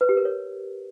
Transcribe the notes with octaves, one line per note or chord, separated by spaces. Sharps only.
B4
G4
A#4
C#5